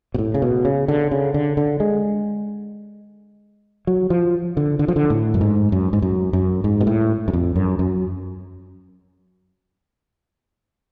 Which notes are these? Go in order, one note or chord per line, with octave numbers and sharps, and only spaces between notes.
B2
A2
C#3
B2
C#3
D3
C#3
D3
D3
G#3
F#3
F3
D3
D3
F3
D3
A2
F#2
G#2
F#2
G#2
F#2
F#2
G#2
B2
A2
F#2
F2
F#2
F#2